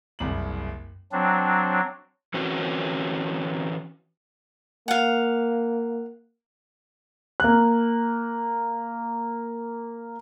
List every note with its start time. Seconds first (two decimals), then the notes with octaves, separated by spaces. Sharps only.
0.19 F#1 C2 F#7
1.12 F#3 C4 D4
2.34 E3 C4 C#4 F#4
4.88 A#3 F5 F#5
7.40 A#3 F#6